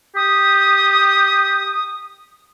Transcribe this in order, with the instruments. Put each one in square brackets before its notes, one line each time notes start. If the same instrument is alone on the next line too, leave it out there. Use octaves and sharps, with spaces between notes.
[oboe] G4 [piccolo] D#6